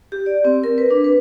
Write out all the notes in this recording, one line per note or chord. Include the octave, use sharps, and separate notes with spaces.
G4
D5
C4
A#4
B4
D4
B4